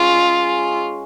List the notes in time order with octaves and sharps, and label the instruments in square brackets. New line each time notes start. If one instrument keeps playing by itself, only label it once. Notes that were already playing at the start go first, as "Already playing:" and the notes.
Already playing: [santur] G#3 C#4 [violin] F4